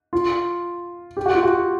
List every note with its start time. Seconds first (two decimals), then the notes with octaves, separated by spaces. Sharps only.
0.13 F4
1.17 G4
1.26 F#4
1.35 F4
1.43 F#4